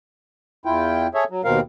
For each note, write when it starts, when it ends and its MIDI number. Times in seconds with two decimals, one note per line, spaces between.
0.65 1.07 40
0.65 1.07 64
0.65 1.07 65
0.65 1.07 79
1.14 1.24 68
1.14 1.24 69
1.14 1.24 73
1.14 1.24 76
1.30 1.42 54
1.44 1.60 39
1.44 1.60 47
1.44 1.60 60
1.44 1.60 70
1.44 1.60 77